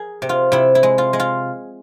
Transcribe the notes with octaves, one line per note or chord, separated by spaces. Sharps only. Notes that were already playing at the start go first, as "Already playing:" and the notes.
Already playing: G#4 A#4
C3
F4
C3 E4
E4
G#3
F4
G#3
F4